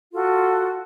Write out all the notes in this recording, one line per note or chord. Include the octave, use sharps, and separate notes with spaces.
F4 F#4 A4